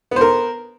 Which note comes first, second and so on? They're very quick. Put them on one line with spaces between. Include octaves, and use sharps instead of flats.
B3 C5 A#4